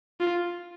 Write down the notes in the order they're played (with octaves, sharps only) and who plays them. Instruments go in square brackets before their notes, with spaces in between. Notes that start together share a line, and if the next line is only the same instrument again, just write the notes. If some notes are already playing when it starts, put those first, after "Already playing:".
[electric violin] F4